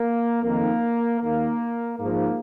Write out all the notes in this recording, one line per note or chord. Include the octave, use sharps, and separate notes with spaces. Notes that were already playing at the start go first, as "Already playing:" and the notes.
Already playing: A#3
F2 D#3 A#3
D#2 D#3 A#3
G#2 F3 A#3